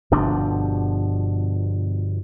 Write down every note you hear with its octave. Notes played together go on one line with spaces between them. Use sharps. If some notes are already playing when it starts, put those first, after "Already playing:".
G1 B2 F3 D4